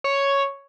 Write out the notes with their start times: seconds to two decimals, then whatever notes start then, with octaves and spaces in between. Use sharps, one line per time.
0.04 C#5